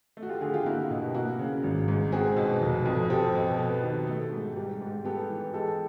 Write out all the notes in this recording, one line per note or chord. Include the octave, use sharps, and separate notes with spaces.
A3
F#4
F4 G4
D3 F#4 G#4
F4 G4
A#3 E4 F#4
B2
G4
A#3 E4 F#4
C#3
G#1
G#2
C4 F#4 G#4
B2
F1
F2
C4 G4 A4
B2
B3
D#3
A3
G#2
G3
G#2
B3 G4 A4
E3
G#3 G4 A4